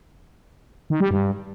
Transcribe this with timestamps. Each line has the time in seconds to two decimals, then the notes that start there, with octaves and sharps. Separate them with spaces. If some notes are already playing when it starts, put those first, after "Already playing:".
0.90 D#3
1.00 G3
1.11 G2